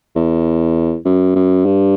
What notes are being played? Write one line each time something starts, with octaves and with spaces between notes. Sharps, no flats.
E2
F#2
F#2
G2